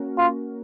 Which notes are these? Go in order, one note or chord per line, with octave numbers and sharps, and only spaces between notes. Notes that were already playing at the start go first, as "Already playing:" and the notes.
Already playing: A#3 C#4 F#4 A#4
F4